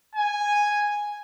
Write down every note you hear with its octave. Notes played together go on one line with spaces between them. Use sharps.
G#5